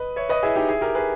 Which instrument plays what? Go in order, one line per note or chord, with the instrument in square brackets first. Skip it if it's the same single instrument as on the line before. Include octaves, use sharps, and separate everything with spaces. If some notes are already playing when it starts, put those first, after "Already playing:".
Already playing: [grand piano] B4 D#5
C#5 E5
B4 D#5
E4 G#4
D#4 G4
E4 G#4
G4 A#4
G#4 B4